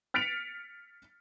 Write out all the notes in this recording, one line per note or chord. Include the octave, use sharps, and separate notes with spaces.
F6 A6 B6 C#7 D7 F7